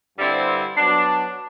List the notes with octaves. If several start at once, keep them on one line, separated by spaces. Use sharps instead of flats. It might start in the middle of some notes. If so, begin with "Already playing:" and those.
G2 D3 G3 C4 E4
F#3 B3 D4